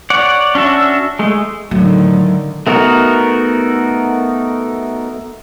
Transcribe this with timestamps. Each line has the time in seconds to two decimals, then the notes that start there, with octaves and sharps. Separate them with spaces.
0.10 C#5 D5 F#5
0.55 C#4 D4 F#4 E5
1.19 G#3 A3
1.71 A2 D3 D#3 F#3
2.67 A3 B3 D#4 F#4 A#4